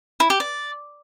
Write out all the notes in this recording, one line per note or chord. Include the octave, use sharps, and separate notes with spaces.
E4
G4
D5